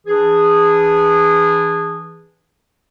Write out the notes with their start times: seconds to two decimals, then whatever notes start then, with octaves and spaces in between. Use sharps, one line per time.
0.07 E3 D4 G#4